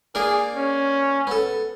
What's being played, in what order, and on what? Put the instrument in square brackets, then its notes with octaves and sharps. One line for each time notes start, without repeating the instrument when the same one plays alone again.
[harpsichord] A#3 D4 A#4 [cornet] G#4
[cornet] C#4
[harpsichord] B3 A4